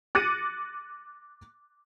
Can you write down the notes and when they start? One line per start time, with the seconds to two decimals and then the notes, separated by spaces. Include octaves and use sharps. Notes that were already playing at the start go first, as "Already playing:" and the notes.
0.15 D6 F#6 A6 A#6 C#7 D#7